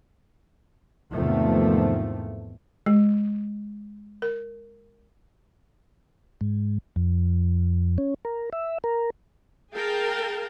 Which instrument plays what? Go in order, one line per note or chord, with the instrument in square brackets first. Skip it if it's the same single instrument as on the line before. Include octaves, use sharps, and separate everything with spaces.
[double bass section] E2 G#2 C3 D#3 F3 A3
[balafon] G#3
A#4
[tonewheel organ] G#2
F2
C#4
A#4
E5
A#4
[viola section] G#4 A#4 F5 G5 A5